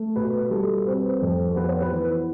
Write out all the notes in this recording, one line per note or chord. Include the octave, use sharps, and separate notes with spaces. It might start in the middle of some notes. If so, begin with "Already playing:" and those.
Already playing: A3
B2 B4
G3 A4
C4 B4
F2 A4
B3 B4
C5
B4
E3